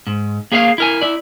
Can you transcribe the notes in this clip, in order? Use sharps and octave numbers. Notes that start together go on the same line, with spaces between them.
G#2
A#3 G#4 C#5 E5 F5
E4 A#4 G#5
E4 D5